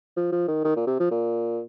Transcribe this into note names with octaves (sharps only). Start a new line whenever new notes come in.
F3
F3
D#3
D#3
A#2
C3
F3
A#2